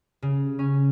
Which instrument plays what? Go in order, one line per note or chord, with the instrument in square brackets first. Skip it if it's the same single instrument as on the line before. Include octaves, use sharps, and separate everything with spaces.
[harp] C#3
C#4